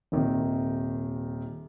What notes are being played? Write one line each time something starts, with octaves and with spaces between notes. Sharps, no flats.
D#1 C3 D#3